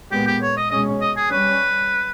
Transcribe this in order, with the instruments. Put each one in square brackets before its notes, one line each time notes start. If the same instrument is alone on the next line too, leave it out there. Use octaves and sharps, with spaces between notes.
[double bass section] A#2 G#3 B3 [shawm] G4
[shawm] G4
C#5
D#5
[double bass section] B2 G#3 C#4 [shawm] D#5
[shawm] D#5
G#4
[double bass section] G3 C#4 [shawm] B4